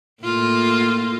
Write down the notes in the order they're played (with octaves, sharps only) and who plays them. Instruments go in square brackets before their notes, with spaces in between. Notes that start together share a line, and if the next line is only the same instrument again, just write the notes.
[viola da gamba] A2 A#3 F4